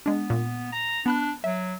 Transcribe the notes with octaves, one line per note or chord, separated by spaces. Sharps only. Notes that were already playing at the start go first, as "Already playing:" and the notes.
G#3 B3 D4
A#2
A#5
B3 D4 B5 F#6
F#3 E5